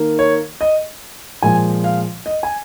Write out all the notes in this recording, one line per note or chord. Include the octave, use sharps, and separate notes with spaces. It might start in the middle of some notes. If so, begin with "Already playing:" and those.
Already playing: D#3 A#3
C#5
D#5
A#2 F3 G#3 G#5
F5
D#5
G#5